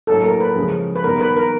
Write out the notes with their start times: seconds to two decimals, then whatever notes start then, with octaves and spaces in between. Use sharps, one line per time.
0.07 A2 F#3 A#3 A4
0.24 A#4
0.40 B4
0.56 C#3 F3 G#3
0.96 B4
1.04 D#3 G3 B3 A#4
1.21 B4
1.36 A#4